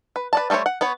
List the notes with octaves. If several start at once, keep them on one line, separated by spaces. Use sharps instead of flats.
B4
B4 D5 A5
G3 A3 A4 C5 C#5
F#5
B3 B4 C#5